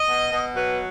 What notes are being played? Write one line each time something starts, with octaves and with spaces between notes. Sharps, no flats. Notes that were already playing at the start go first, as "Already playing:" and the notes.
Already playing: D#5
B2
B2
F#3 B4